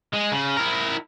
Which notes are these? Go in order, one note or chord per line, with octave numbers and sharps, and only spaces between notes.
G#3
C#3
E4 A#4